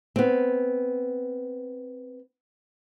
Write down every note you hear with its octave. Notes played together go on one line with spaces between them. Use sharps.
B3 C4